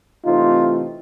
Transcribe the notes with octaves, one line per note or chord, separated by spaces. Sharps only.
C3 E3 A3 C4 D#4 F4